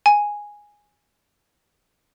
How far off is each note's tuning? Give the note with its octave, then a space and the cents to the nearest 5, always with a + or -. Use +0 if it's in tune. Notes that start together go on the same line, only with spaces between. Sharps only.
G#5 -5